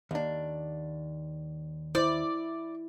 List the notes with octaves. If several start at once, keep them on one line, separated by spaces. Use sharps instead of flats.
D#2 D4
E4 C5 D5